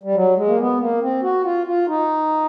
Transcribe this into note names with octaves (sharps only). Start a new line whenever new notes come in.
G3
F#3
G#3
A#3
B3
A#3
C4
F#4
F4
F4
D#4